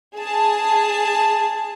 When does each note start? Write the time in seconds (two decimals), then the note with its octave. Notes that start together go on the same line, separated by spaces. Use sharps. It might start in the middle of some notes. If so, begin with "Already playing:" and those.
0.17 G#4 A5